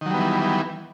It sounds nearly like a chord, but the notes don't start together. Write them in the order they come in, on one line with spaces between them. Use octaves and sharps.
D#3 F#3 G3 B3 E3